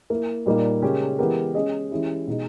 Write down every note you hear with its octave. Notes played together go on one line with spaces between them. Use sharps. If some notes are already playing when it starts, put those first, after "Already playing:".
A#3 E4 A#4
A#2 G3 A#3 D#4 A#4
C#3 G#3 C#4 G4 A#4
E3 G#3 B3 G4 A#4
G#3 C#4 G#4 D#5
E3 G#3 C#4 E4 G4
B2 G#3 D#4